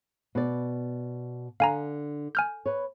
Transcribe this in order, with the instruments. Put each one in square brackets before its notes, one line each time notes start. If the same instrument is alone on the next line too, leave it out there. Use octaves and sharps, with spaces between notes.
[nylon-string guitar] B2 D5
[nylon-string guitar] D3 [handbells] F5 G#5 A#5
[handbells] G#5 F6 G6
[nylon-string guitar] B4 C#5